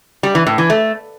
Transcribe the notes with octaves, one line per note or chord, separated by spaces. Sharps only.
G3
E3
A2
E3
A3